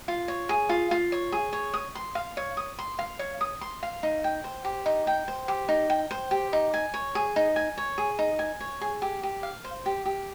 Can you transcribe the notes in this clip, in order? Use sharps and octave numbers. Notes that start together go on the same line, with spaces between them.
F4
C#5
G#4
F4
F4
C#5
G#4
C#5
D#6
C6
F5
C#5
D#6
C6
F5
C#5
D#6
C6
F5
D#4
G5
C5
G4
D#4
G5
C5
G4
D#4
G5
C5
G4
D#4
G#5
C#5
G#4
D#4
G#5
C#5
G#4
D#4
G#5
C#5
G#4
G4
G4
F5
C5
G4
G4